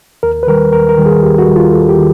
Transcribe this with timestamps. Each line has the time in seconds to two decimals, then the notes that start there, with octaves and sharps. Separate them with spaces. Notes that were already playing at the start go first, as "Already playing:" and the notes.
0.23 D#2 A#4
0.43 B4
0.47 D#3 G3 A#4
0.73 D#2 A#4
0.89 A#4
0.98 D#3 G3
1.06 G#4
1.23 D#2 G4
1.39 F#4
1.47 D#3 G3
1.56 F4
1.72 D#2 A4
1.89 G4
1.97 D#3